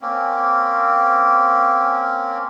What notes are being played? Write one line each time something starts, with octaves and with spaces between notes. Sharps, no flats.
A#3 C4 C#4